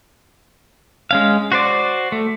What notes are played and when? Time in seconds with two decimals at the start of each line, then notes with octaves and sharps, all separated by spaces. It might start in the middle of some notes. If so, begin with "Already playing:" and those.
1.11 G#3 C#4 F5
1.52 F#4 C5 D5
2.12 A3